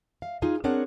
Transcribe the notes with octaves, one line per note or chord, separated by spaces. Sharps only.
F5
D#4 F4 G#4 F5
C4 D4 G#4 A#4 C#5 F#5